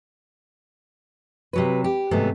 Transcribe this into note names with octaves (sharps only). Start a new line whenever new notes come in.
C3 F#3 B4
G4
G#2 C3 E3 F#3 A3 B3